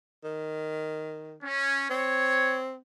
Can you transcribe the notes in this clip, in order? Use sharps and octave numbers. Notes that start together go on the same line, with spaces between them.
D#3
C#4
C4 C#5